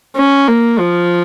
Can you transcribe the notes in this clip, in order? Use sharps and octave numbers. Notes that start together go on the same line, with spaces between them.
C#4
A#3
F3